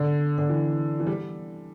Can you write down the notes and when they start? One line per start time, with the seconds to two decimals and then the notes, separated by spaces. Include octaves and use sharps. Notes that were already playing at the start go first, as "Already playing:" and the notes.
Already playing: D3
0.38 D3
0.49 E3
1.00 E3
1.07 G3